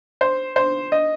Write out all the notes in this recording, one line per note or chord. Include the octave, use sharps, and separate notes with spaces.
C5
C5
D#5